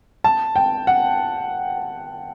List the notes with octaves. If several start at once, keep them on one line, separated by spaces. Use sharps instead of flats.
A5
G5
F#5